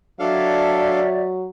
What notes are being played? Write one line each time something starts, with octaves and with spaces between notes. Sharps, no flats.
F#3 D4 A4 C#5 D5 E5 F5